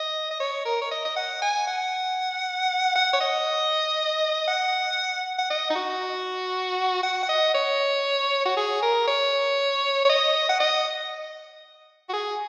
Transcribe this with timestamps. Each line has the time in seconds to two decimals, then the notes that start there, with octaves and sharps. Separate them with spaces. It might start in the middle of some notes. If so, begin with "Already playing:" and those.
Already playing: D#5
0.31 D#5
0.40 C#5
0.65 A#4
0.82 C#5
0.91 D#5
1.05 D#5
1.16 F#5
1.42 G#5
1.67 F#5
2.95 F#5
3.13 C#5
3.21 D#5
4.48 F#5
5.39 F#5
5.50 D#5
5.70 D#4
5.76 F#4
7.03 F#5
7.23 F#5
7.29 D#5
7.54 C#5
8.46 F#4
8.57 G#4
8.82 A#4
9.07 C#5
10.05 C#5
10.09 D#5
10.49 F#5
10.60 D#5
12.09 F#4
12.13 G#4